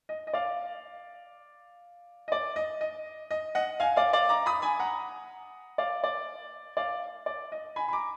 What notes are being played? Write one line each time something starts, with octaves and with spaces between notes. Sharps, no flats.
D#5
D#5
D5 F5
D#5
D5
D#5
D#5
D#5
D#5 F#5
F5 G#5
D5 F5
D5 F5
A#5 D6
B5 D#6
G#5 B5
F#5 A#5
D5 F5
D5
D5 F5
D5
D#5
G#5 B5
B5
A#5 D6